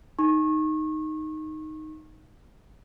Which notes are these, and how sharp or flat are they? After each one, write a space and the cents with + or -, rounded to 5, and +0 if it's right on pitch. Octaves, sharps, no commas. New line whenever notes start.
D#4 +0 C#6 -30